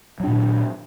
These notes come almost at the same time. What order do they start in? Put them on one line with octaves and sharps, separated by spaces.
F#3 D4 A#2 D#3